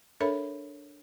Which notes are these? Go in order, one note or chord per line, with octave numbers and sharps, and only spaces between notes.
D4 A4 A#4 C#5 E5 B5